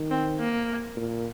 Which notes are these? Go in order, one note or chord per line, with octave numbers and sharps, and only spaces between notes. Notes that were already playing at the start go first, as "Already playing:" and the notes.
Already playing: D#3
C4
A#3
A#2